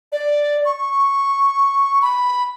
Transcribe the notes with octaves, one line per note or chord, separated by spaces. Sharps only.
D5
C#6
B5